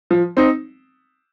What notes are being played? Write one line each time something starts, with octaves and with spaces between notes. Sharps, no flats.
F3
C4 D#4